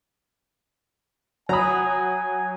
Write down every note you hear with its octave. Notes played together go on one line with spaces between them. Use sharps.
F#3 G#5 A#5 B5 D#6